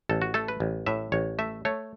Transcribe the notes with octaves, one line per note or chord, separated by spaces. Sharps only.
A1 A4
F#4
A3 A4
B4
A1
A2 E5
A1 C#5
A3 E5
A3 C#5